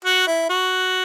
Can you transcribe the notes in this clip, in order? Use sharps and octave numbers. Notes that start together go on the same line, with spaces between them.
F#4
E4
F#4